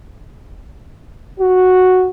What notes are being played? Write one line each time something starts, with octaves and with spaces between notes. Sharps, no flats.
F#4